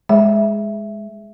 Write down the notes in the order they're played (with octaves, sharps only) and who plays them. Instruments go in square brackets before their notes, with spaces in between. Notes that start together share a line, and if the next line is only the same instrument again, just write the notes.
[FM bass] G#3 [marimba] E5